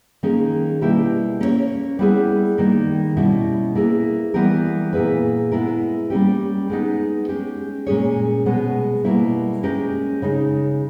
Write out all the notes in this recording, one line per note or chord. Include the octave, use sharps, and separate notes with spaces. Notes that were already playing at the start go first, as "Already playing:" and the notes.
D#3 A#3 C#4 G#4
B2 G3 A#3 E4 G4
A#3 C#4 E4 A#4 C#5
G3 B3 E4 G#4 B4
D#3 G3 A#3
B2 G3 C#4 E4
A#3 E4 G#4 B4
E3 G3 B3 G4 A#4
A#2 A#3 E4 G#4 B4
G#3 B3 E4 A#4
G3 A#3 C#4 G4
G#3 B3 D#4
G#3 C#4 G4
A#2 G#3 C#4 G#4 C#5
B2 G#3 B3
B2 G3 A#3 E4
G#3 C#4 G4 A#4
C#3 G#3 D#4